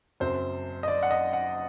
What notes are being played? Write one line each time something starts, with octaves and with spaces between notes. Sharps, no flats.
F#1 F#2 F#3 C4 C5
D#5
D5
F#5
D#5
F#5